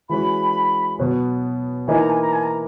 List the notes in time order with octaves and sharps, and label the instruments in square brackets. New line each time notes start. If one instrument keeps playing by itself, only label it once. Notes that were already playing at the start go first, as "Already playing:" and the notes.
[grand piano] E3 G#3 C#4 F#4 [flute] B5
[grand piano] B2 F#3 B3
[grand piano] E3 A#3 D#4 [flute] G#5
[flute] A#5
G#5
A#5
G#5
A#5